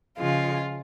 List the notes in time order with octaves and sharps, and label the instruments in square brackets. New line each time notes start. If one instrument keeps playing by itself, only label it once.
[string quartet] C#3 F3 G#3 F4